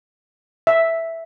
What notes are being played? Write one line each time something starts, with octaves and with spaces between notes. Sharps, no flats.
E5